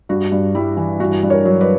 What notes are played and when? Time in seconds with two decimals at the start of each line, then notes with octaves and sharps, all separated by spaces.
0.09 G2 F#4
0.32 G2
0.55 G3 E4
0.77 E3
1.00 G2 F#4
1.23 G2
1.30 A#4 C#5
1.45 F#3
1.61 B4 D5